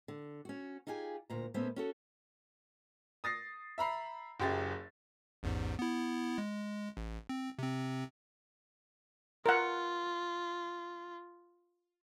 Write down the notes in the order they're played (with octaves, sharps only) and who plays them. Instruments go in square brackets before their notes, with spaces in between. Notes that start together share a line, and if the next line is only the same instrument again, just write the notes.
[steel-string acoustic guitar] D3
C#4 F#4
D#4 F4 G4 G#4 G#5
D2 A#2 A#5
A#2 A3 B3 C#4 C5 E5
C#4 F#4 A4
[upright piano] D#6 A6 A#6 C7
E5 A#5 B5 C7
F#1 F#2 G4 G#4 A6
[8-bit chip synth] A1 E2 G#2
B3 E4
G#3
A1
C4
C3 C4
[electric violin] F4 [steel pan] A#4 F#5